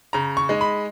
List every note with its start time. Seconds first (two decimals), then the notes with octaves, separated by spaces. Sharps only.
0.13 C#3 A#5
0.37 C#6
0.49 G#3 D#4
0.61 B5